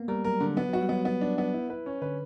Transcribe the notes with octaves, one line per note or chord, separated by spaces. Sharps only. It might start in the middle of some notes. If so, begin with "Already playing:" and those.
Already playing: A#3 B3
G3 A#4
F#3 A#4
D3
F#3 B3
F#3
F#4
G3
F#3 B3
B3
D4
B3
E4
B4
C#4
D3 B4